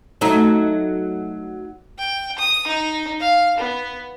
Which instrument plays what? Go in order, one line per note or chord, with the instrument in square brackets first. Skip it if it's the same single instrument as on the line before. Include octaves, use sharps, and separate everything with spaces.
[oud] F#3 A3 D#4
[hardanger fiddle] G5
D#6
D#4
F5
B3